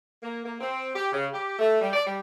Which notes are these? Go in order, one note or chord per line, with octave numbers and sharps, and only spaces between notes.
A#3
A#3
C4
G4
C#3
G4
A3
G3
D5
G3